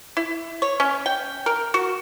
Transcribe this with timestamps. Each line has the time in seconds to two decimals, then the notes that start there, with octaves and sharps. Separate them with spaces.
0.17 E4
0.62 C#5
0.80 C#4
1.06 G5
1.46 A#4
1.74 F#4